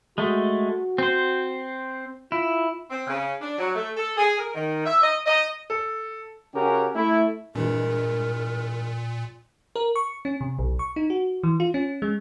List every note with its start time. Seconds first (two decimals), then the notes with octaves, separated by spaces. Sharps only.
0.18 G#3 A3 F#4
0.98 C4 C5
2.32 E4 F4
2.90 C4
3.07 C#3
3.42 D4
3.59 F#3
3.75 A3
3.97 A4
4.17 G#4
4.39 A#4
4.55 D#3
4.86 E5
5.03 D#5
5.26 D#5
5.70 A4
6.54 C#3 C#4 F#4 G4 A#4
6.94 A3 E4
7.55 G2 A#2 E3 G#3 A#4
9.76 A#4
9.96 C#6
10.25 C#4
10.41 C3
10.59 B1
10.79 C#6
10.96 D#4
11.10 F#4
11.43 E3
11.60 F4
11.74 C#4
12.02 G#3